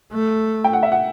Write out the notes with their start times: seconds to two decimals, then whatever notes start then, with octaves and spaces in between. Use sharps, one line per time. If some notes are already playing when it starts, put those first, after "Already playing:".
0.13 A3
0.64 G5
0.73 F#5
0.83 E5
0.92 F#5